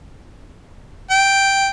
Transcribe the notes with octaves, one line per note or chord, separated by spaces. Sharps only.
G5